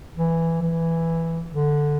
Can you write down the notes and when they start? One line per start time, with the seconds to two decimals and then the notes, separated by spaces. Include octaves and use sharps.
0.17 E3
0.62 E3
1.51 D3